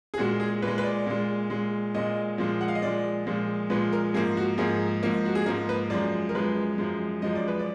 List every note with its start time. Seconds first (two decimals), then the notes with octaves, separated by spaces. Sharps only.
0.14 G#4
0.18 A#2 G#3 F#4
0.40 G#4
0.62 A#2 B4
0.67 G#3
0.78 B4
0.84 D5
1.06 A#2 G#3
1.50 A#2 G#3
1.94 A#2 G#3 D#5
2.38 A#2 F3 G#3
2.61 F#5
2.68 F5
2.75 D#5
2.82 A#2 F3 G#3 D5
3.26 A#2 F3 G#3
3.70 A#2 F3 G#3 B4
3.93 A#4
4.14 G#2 F3 A#3 G#4
4.37 F#4
4.58 G#2 F3 A#3 G#4
5.03 G#2 F3 A#3
5.25 F#4
5.35 G#4
5.46 G#2 F3 A#3 A#4
5.69 B4
5.90 F#2 F3 G#3 D5
6.29 A#4
6.35 F#2 F3 G#3 B4
6.78 F#2 F3 G#3
7.22 F#2 F3 G#3 D#5
7.35 D5
7.48 B4
7.59 D5